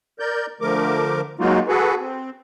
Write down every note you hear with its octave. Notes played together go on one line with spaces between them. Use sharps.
A#4 D5 G6
D3 F3 A3 A#4 D6
F#3 G#3 A#3 D#4 F4 F#4
F#4 G#4 A4 B4
C4